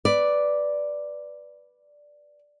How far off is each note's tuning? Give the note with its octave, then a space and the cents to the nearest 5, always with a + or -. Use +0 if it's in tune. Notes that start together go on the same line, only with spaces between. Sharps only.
B4 +0 D5 +0